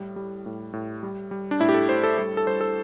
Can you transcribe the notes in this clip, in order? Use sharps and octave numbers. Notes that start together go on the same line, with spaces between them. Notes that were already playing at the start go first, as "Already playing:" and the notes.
Already playing: A2 G3
G3
A2
A2
G3
G3
D4
A2 E4
G4
A4
A2 C5
A4
G3 A4
A4
G3 C5
A4